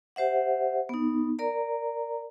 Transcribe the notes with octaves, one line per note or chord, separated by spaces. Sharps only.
G4 C5 E5 F#5
B3 D#4
A#4 D5 A#5